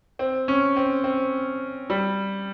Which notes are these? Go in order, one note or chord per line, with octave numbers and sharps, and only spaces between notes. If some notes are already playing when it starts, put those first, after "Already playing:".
C4
C#4
C4
C4
G3